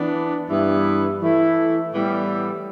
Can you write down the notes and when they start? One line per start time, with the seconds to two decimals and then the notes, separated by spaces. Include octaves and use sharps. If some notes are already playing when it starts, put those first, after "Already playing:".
Already playing: E3 B3 D4
0.49 G2 E3 B3 E4
1.20 E3 A3 E4 A4
1.92 A2 E3 G3 B3